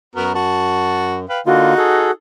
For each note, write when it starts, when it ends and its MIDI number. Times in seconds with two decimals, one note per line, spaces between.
0.16 1.26 42
0.16 0.32 59
0.16 0.32 66
0.16 0.32 70
0.35 1.17 66
0.35 1.17 81
1.29 1.40 71
1.29 1.40 77
1.29 1.40 79
1.46 1.73 50
1.46 1.73 58
1.46 2.08 63
1.46 1.73 65
1.46 2.11 66
1.78 2.11 68
1.78 2.11 69